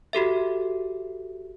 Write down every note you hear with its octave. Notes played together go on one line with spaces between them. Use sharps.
F#4 G4 A4 E5